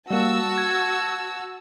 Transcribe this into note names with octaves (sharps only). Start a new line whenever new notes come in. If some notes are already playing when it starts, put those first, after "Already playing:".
G3 A#3 F#4 A5 E6
G#6